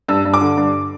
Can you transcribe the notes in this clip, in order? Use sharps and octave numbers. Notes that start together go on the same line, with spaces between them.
G2 E6
G2
D6
D3
G2